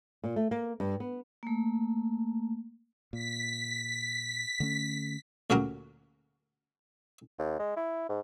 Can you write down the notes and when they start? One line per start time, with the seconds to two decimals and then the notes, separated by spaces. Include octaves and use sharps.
0.24 A#2
0.36 A3
0.51 A#3
0.80 G2
1.00 B3
1.43 A3 A#3
3.13 A#2 B6
4.60 D3 A3 C#4
5.50 D2 A#2 C#3 F#3 F#4 A#4
7.39 D#2
7.59 G#3
7.77 E4
8.09 G#2